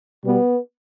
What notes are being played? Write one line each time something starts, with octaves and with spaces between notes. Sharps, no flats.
B2 G3 B3